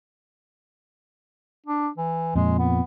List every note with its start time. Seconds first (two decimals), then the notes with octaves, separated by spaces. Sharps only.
1.66 D4
1.98 E3
2.36 F2 A#2 G#3
2.59 B3